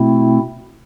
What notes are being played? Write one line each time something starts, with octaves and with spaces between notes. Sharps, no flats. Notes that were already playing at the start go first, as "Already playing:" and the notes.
Already playing: B2 A3 C4 E4